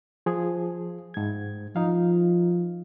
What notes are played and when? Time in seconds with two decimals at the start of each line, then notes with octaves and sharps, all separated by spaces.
0.26 F3 G#4
1.14 G#2 G#6
1.76 F3 D#4 F5